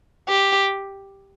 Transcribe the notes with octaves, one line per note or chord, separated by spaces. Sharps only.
G4